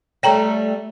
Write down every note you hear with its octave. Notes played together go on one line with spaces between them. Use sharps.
G3 A3 C#5 G5 A#5